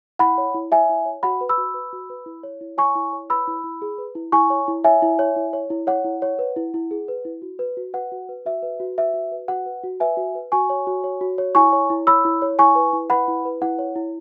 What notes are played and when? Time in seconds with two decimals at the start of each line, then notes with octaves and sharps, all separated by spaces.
0.19 E4 F#5 B5
0.38 C#5
0.54 E4
0.72 C#5 E5 G#5
0.89 E4
1.05 C#5
1.23 F#4 F#5 B5
1.41 B4
1.49 B5 E6
1.58 F#4
1.74 B4
1.93 F#4
2.10 B4
2.26 E4
2.43 C#5
2.61 E4
2.77 C#5 G#5 C#6
2.95 E4
3.13 C#5
3.30 B4 B5 E6
3.47 E4
3.64 E4
3.82 G#4
3.98 B4
4.15 E4
4.32 E4 G#5 C#6
4.50 C#5
4.68 E4
4.84 C#5 E5 G#5
5.02 E4
5.19 C#5
5.36 E4
5.53 C#5
5.70 E4
5.87 C#5 F#5
6.05 E4
6.22 C#5
6.39 B4
6.56 E4
6.74 E4
6.91 G#4
7.08 B4
7.25 E4
7.42 F#4
7.59 B4
7.77 F#4
7.93 B4 F#5
8.12 F#4
8.29 B4
8.45 F#4 E5
8.63 B4
8.80 F#4
8.98 B4 E5
9.14 F#4
9.32 B4
9.48 F#4 F#5
9.66 B4
9.83 F#4
10.00 B4 E5 G#5
10.17 F#4
10.35 B4
10.52 F#4 G#5 C#6
10.70 C#5
10.87 F#4
11.04 C#5
11.21 F#4
11.38 C#5
11.55 E4 G#5 C#6
11.73 C#5
11.90 E4
12.07 C#5 B5 E6
12.25 E4
12.42 C#5
12.59 E4 G#5 C#6
12.75 B4
12.93 E4
13.10 B4 F#5 B5
13.28 E4
13.45 B4
13.62 E4 F#5
13.79 C#5
13.96 E4